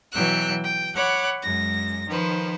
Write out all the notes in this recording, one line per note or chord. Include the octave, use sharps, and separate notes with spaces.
B2 E3 F#3 G5 E6 F#6
G5
C#5 F#5 B5 D6
F#2 G#3 A#6
D#3 F3 B4 C5